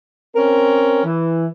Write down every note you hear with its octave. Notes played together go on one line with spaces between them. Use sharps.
C4 C#4 A#4
E3